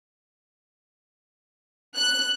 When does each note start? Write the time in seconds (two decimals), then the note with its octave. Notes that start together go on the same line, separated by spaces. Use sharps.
1.96 F#6